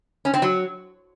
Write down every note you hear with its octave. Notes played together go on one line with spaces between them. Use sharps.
C#4
C4
F#3